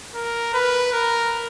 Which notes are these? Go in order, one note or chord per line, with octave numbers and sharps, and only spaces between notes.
A#4
B4
A#4